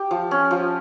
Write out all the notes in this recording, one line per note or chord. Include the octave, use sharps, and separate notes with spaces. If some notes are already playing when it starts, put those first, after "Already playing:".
Already playing: G4
F3
C#4
F3